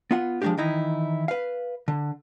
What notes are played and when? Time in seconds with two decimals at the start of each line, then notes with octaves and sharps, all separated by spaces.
0.11 B3 F4 F#5
0.42 F3 G#3 A#3 C#4 D4 G4
0.57 D#3 E3 D#4 E4
1.28 B4 F5
1.88 D3